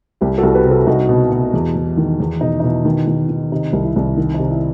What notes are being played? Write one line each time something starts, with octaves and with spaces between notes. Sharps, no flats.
C2 E4 G4
F#4 A4
C2
G4 B4
C3
F#4 A4
C2 D#4 F#4
B2
B2
E2
E2
D#3
E2
B2 D#4
D#4
B2 E4
D#3
D#3
D#3
C3 D#4
C2
E4
C2
D#3
D#4
C3
E4